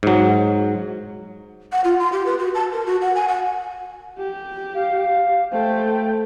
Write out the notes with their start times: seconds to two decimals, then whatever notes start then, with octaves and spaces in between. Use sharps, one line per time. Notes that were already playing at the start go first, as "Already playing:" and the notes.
0.03 G#2 F#3
1.72 F#5
1.84 F4
2.00 C6
2.12 G4
2.26 B4
2.39 F#4
2.55 A5
2.72 A#4
2.86 F#4
3.01 F#5
3.15 G#5
3.28 F#5
4.18 G4
4.75 F5
5.51 A3 C5 G5